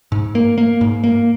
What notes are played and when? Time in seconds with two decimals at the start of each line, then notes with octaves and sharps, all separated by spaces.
0.12 G#2
0.35 A#3
0.58 A#3
0.81 G#2
1.04 A#3